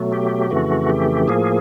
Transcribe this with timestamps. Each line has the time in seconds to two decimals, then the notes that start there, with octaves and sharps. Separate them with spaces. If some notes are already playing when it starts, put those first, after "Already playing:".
Already playing: B2 F#3 A3
0.13 G4
0.50 F2 C#3 E3 A3 F#4
0.90 G4
1.28 A2 F3 A#3 G#4